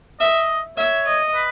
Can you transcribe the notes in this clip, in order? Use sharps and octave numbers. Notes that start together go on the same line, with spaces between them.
D#5 E5
C#5 E5
D#5
B4